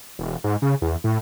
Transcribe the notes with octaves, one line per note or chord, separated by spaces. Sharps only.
E1
G#2
C#3
E2
A2